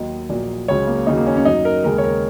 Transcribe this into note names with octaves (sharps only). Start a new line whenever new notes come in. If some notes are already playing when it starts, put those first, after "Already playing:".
Already playing: D#2 D#3 F#3 D#5
A#1 A#2 F#3
C#2 C#3 F#3 C#5
A#3
D#2 C#3 F#3 D#4
A#3
C#4
C#4
F#2 F#3 D#4
A#4
D#2 C#3 G#3 A#4
C#5
A#4